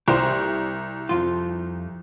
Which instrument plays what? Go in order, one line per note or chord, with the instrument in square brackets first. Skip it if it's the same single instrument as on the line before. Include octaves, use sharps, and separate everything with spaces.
[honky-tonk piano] C2 [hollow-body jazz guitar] G4 C5
[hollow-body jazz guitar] F2 F3 F4